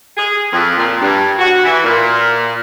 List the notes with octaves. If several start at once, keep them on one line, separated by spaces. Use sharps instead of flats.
G#4
F2
A#2
G2
F#4
E3
A#2